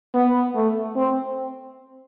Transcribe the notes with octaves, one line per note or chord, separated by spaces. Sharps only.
B3
A3
C4